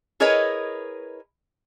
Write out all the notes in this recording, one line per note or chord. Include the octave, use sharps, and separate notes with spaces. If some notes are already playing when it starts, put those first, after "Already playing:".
E4 G#4 A#4 B4 C#5 D#5